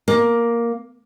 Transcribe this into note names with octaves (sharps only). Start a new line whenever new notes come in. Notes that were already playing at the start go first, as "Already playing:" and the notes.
A#3